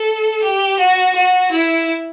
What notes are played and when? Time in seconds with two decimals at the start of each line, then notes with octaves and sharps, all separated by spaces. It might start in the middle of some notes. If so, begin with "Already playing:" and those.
Already playing: A4
0.43 G4
0.79 F#4
1.15 F#4
1.51 E4